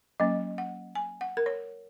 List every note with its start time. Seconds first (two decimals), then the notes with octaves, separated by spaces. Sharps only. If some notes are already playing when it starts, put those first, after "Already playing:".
0.20 F#3 A#3 C#4 D#5
0.58 F#5
0.95 G#5
1.21 F#5
1.37 A#4
1.46 C#5